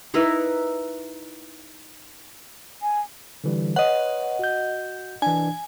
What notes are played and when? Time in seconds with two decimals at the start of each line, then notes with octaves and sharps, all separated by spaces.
0.14 D#4 E4 A#4 B4
2.82 G#5
3.44 D3 E3 G3
3.76 B4 C#5 D#5 F#5
4.39 F#4 G6
5.22 E3 D4 G#5